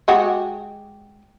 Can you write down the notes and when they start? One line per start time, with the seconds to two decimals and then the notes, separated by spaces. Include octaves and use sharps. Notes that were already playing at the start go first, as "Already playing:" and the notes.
0.08 G#3 F#4 G4